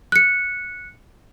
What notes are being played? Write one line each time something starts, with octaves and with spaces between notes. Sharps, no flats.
F#6 C#7